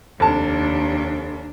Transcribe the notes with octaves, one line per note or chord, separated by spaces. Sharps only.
F1 D#2 D4 A5